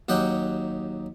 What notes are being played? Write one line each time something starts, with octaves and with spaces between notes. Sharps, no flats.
D#2 F#3 D#4 G4 F#5